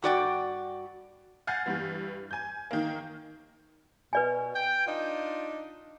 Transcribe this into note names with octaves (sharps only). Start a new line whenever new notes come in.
G2 F#4 D5 G5
F#5 G#5 F6 G6 A6 C7
G2 E3
G#5 G6
D#3 A#3
B2 B4 D5 G#5
G5
D4 D#4 F4